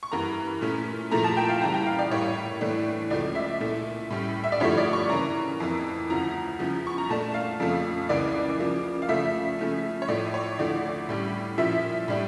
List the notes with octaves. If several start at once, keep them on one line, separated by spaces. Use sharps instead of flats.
C#6
G2 E3 A#3 A#5
A#2 A3 C#4 E4
A#2 F3 A3 E4 A#5
A5
G5
F5
C#3 E3 G3 A#5
G5
F5
D5
A2 G3 A#3 E4 C#5
A2 E3 A3 D4
C#2 C#3 F3 A3 D5
E5
A#2 A3 E4
A2 G3 C#4
E5
D5
G2 D3 F3 A3 E4 C#5
D5
C#6
C#3 E3 A#3 A#5
F2 E3 A#3
D2 C#3 F3 C#4 E4 A#5
E2 C#3 F3 C#4 E4
C#6
A#5
A#2 A3 D4 A5
F5
F2 C#3 F3 A3
C#2 C#3 E3 A#3 D5
C#3 F3 A#3
F5
C#3 F3 A3 E5
C#3 F3 A3 C#4
C#5
A2 F3 A3 E4 D5
C#5
D2 D3 F3 A3 E4 D5
A2 G3 C#4
A#2 F3 C#4 E4 E5
A2 G3 D4